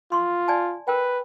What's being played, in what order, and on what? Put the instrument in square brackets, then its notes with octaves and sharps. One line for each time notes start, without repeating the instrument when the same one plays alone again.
[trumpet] F4 [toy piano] C6 C#6
[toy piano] D5 G#5 A5
[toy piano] A#4 G5 [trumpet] B4